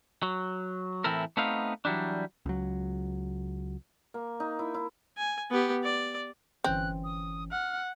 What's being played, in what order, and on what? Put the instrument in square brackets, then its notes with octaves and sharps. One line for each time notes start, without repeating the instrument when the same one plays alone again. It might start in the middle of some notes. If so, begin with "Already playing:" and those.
[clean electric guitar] F#3
A2 E3 C4 E4 A4 A#4
A3 B3 C4 D#4 F5
E3 F#3 G3 D4
[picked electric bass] C#2 F#3
[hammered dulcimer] A#3
D#4
E4
E4
[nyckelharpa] G#5
B3 G4
D5
[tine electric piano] G1 E3 C#4 [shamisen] C4 [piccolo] F#6
[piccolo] D#6
[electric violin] F#5 [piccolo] F6